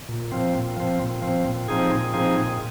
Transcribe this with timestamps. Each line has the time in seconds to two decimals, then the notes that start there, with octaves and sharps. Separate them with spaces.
0.09 A#2
0.32 F3 C4
0.55 A#2
0.77 F3 C4
0.99 A#2
1.22 F3 C4
1.45 A#2
1.68 F3 C4 D#4 G#4
1.92 A#2
2.14 F3 C4 D#4 G#4
2.36 A#2